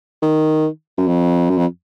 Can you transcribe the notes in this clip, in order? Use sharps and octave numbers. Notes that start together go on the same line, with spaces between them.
D#3
F#2
F2
F#2
F2